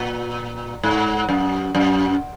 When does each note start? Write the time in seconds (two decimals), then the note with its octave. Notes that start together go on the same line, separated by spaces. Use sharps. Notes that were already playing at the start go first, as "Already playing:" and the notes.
Already playing: A#2
0.83 G#2
1.29 F#2
1.75 F#2